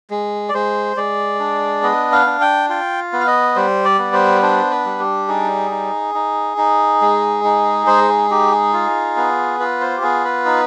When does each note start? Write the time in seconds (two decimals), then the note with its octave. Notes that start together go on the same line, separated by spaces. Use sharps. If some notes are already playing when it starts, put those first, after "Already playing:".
0.10 G#3
0.49 D5
0.54 G#3 C5
0.97 G#3 D5
1.40 D4
1.83 B3 D#5
2.12 F5
2.26 D4
2.41 G5
2.69 F4 G5
3.13 B3
3.20 F5
3.27 D#5
3.56 G3 C5
3.85 D5
3.99 B3
4.13 C5
4.42 D4 C5
4.70 B4
4.85 G3
5.00 G4
5.28 D#4 G#4
5.71 D#4
6.15 D#4
6.57 D#4
7.01 G#3
7.44 D#4
7.87 G#3 C5
8.08 G#4
8.30 D#4 G4
8.52 G#4
8.73 F4
9.16 B3
9.60 F4 B4
9.81 C5
9.97 G4
10.02 B3 G#4
10.24 B4
10.46 D#4